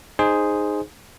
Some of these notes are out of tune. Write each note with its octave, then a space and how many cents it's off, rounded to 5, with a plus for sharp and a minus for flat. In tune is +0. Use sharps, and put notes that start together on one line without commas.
D#4 -10 G#4 +0 C5 +0